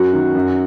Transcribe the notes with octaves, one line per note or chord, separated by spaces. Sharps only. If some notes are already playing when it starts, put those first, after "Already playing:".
Already playing: F#2 F#4
D#3
F#2